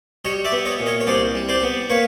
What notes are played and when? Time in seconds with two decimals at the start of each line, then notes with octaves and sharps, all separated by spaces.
0.25 G3 C#5 D#5
0.45 D5 E5
0.52 B3
0.65 C#5 D#5
0.80 A#2
0.86 C#5 D#5
1.00 C#5
1.07 C2 C5 D5
1.35 G3
1.49 C5 D5
1.63 B3
1.90 A#3 B4 C#5